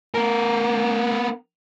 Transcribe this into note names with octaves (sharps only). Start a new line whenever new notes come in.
B3 A#4